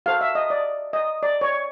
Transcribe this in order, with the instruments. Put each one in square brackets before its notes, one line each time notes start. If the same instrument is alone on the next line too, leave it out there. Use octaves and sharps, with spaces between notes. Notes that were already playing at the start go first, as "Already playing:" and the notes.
[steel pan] F#4 A4 C5 F5
E5
D#5
D5
D#5
D5
C#5